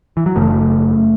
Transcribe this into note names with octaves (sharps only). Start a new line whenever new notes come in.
E3
F#3
F#1 F#2 C#3 A3